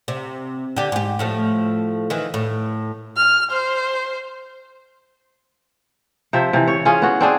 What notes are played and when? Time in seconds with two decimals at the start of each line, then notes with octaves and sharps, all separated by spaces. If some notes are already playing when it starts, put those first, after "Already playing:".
0.08 C3
0.76 D3 G4
0.92 G#2 G4
1.19 A2 F3 A3
2.10 D#3 E3
2.34 A2
3.16 F6
3.51 C5
6.33 C3 F3 C5 E5
6.53 C3 E3
6.68 C#5
6.85 C#4 F4 G#4
7.02 B3 F#4
7.21 C4 D4 G#4